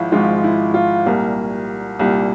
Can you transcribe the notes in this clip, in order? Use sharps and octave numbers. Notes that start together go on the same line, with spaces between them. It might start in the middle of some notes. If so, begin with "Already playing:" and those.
Already playing: G#1 F3 G#3 E4 F4
G#1 G#2 F3 G#3 F4
E4
F4
C2 A#2 G3 A#4
C2 A#2 G3